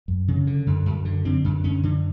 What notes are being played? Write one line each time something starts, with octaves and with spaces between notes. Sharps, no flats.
F#2
C#3
D3
F#2
F#2
D3
D3 C4
F#2
F#2 C#4
D3